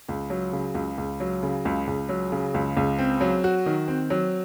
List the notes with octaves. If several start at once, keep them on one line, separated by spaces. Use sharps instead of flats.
C#2
F#3
C#3
C#2
C#2
F#3
C#3
C#2
C#2
F#3
C#3
C#2
C#2
C4
F#3
F#4
D#3
C4
F#3